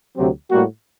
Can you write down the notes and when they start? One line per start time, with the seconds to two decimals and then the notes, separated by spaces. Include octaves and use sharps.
0.16 D2 C3 F#3 C4 G4
0.50 A2 G3 A#3 F#4